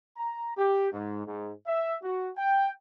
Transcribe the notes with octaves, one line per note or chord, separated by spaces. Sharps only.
A#5
G4
G#2
G#2
E5
F#4
G5